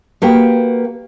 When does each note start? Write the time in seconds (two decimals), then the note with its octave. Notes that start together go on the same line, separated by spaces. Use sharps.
0.22 A#3 F#4 G4 B4 F5 G5